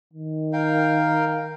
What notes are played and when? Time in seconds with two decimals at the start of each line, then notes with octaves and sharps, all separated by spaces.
0.13 D#3
0.53 A#4 F5 G5